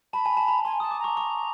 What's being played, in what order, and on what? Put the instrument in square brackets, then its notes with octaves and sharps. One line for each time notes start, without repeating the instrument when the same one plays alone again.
[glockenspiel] A5 [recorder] B5
[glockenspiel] G#5
A5
A#5
[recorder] G#5 [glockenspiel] C6
[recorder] A5 [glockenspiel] D#6
[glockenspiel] D6
[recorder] A#5 [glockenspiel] C#6
[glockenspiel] C#6